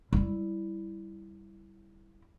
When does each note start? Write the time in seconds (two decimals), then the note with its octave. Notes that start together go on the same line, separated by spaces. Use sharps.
0.13 G3 E4